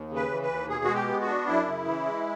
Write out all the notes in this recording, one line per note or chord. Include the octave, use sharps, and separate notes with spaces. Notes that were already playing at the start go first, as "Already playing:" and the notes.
Already playing: D#2
C#3
B4
E3
B4
D#2
B2 G#4
G#3 F#4
G4
B3
F#4
D4
F#2 E4
C#3
E3
G#3